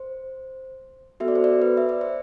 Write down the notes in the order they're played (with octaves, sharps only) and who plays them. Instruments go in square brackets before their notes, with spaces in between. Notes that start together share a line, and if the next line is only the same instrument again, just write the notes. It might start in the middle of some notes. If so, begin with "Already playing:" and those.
Already playing: [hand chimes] C5
B3 F#4 A4 E5
D5
C5
D5
B4
E5
D5
C5